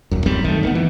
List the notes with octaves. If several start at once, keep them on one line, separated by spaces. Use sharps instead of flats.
D#1 F#2
B1 F#2 G3 C4
D#3 A3
G2 D#3 B3
E3